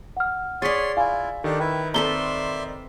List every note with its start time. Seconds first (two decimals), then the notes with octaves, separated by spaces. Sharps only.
0.17 F#5 F6
0.62 G#4 C#5 D5 C6 A6 B6
0.97 E4 F4 F5 G#5
1.44 D#3 D4 G4 A4
1.60 E4 B4 G5
1.94 C4 A4 B4 D5 E5 A#5 C6 G7